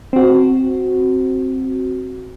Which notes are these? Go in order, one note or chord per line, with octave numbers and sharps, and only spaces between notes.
C4 F#4